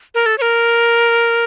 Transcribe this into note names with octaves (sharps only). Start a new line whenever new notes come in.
A#4
A4
C#5
A#4